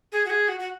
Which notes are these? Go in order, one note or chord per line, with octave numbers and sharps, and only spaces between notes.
G#4
F#4
G#4
F#4
F#4